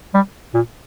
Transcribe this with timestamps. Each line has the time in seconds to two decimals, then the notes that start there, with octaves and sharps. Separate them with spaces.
0.14 G3
0.54 A#2